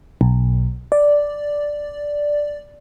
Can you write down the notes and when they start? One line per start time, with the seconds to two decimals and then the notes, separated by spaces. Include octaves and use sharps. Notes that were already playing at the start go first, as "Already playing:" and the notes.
0.21 B1
0.92 D5